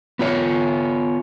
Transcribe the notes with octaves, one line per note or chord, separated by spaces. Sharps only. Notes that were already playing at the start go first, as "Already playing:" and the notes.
B3 F4 C#5